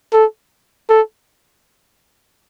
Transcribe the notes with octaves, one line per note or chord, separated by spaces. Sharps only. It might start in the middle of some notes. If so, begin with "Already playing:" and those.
A4
A4